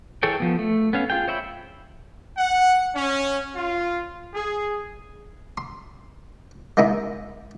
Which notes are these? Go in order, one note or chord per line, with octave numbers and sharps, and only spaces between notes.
E3 G#4 A4 C#5 G5
F3 B3
A3
B3 C#4 F5
F4 G#4 G5
C5 C#5 E5 G5 B5
F#5
C#4
F4
G#4
C6
G#3 A#3 D#4 E4